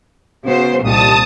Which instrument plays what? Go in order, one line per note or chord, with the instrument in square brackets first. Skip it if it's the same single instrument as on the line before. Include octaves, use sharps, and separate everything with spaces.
[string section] C#3 C5 [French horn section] B3 F#4
[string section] C2 A#2 [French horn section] D#3 F3 G3 [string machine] A5 D#6